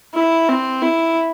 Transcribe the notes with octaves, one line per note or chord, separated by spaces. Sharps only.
E4
C4
E4